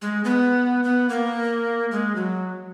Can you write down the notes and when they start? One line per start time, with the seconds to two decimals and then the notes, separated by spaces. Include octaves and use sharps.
0.02 G#3
0.24 B3
0.84 B3
1.09 A#3
1.91 G#3
2.15 F#3